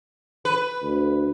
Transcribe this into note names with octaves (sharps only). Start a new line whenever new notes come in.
B4
D2